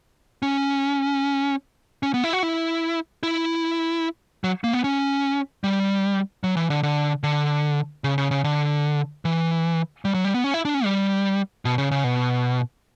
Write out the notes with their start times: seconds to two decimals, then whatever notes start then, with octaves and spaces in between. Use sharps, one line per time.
0.42 C#4
2.03 C#4
2.14 B3
2.24 E4
2.33 F#4
2.43 E4
3.23 E4
4.44 F#3
4.64 A#3
4.73 B3
4.84 C#4
5.64 G3
6.44 F#3
6.57 E3
6.70 D3
6.83 D3
7.23 D3
8.04 C#3
8.18 C#3
8.31 C#3
8.44 D3
9.25 E3
10.05 G3
10.14 F#3
10.25 G3
10.34 B3
10.44 C#4
10.54 E4
10.65 D4
10.74 C#4
10.85 G3
11.65 B2
11.78 C#3
11.91 C#3
12.04 B2